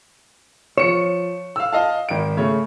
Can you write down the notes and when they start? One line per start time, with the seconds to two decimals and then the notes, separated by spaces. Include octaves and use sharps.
0.78 F3 C#5 C#7 E7
1.56 F5 E6
1.73 D#5 F5 A5
2.09 G#1 D7
2.37 C#3 A3 C#5